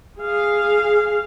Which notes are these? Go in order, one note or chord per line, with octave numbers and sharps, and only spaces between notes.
G#4 F5